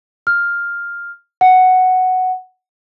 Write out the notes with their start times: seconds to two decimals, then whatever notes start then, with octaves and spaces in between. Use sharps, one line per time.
0.27 F6
1.41 F#5